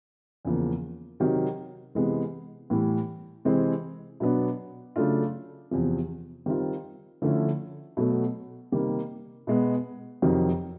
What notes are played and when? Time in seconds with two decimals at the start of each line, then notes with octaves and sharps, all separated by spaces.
0.45 E2 C#3 F3 A#3
1.20 C3 D#3 F#3
1.95 C3 E3 G#3 B3
2.70 A2 E3 G3
3.45 C3 E3 G#3 C4
4.20 B2 F#3 B3 D4
4.96 C#3 F#3 A3 D4 F4
5.71 E2 C3 F3
6.46 D#3 G3 C4 F4
7.22 D3 F3 A3 C#4 E4
7.97 B2 F#3 A3
8.72 C3 D#3 G3 A#3
9.47 B2 G#3 B3
10.22 F2 C3 D#3 F#3